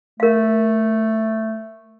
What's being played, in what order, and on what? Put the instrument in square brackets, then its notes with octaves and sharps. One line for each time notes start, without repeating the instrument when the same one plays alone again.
[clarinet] A3 [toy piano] A#4 F5